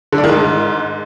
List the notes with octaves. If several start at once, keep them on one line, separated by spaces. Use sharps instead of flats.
D3
D4
D#3
G#2